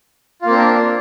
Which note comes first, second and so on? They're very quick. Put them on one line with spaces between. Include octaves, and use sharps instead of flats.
F4 A#3 C4 D4 A#4